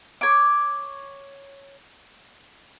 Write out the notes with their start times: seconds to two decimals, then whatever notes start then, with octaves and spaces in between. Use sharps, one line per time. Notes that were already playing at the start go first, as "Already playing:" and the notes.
0.21 C#5 D6